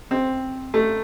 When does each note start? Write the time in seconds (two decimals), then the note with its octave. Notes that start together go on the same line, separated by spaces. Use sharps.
0.11 C4
0.74 A3